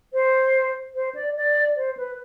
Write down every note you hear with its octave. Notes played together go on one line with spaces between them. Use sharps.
C5
C5
D5
D5
C5
B4